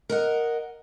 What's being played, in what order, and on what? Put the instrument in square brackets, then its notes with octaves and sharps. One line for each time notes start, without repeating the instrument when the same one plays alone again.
[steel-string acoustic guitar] A#4 D#5 F#5